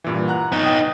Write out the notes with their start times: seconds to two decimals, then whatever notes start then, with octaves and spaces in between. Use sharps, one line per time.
0.04 G2 A#2 E3
0.28 F#5 A#5 F#6
0.52 B3 D#4
0.64 G5 D#6